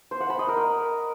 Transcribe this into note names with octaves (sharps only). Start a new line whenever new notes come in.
C5
F#5
B5
D#5
A#4